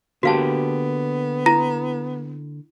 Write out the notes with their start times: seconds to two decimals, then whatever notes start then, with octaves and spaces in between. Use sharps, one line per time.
0.23 D3 A#3 B3 F#4 G4 F5 A5
1.46 E4 A#5 A#6